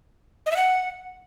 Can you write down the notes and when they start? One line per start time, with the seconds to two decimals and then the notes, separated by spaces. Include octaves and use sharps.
0.46 D#5
0.51 E5
0.56 F#5